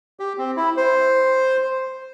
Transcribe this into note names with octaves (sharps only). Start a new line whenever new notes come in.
G4
C4
E4
C5